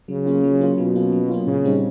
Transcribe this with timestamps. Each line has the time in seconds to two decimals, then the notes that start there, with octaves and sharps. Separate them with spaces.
0.08 C#3 F#3
0.26 A#3 C#4 F4
0.43 F#3
0.61 A#3 C#4 F4
0.78 B2 F#3
0.96 A#3 C#4 F4
1.12 F#3
1.30 A#3 C#4 F4
1.47 A#2 C#3
1.64 G3 C4 D#4